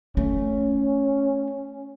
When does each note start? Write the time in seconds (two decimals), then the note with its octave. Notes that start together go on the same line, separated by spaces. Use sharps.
0.17 A3 C#4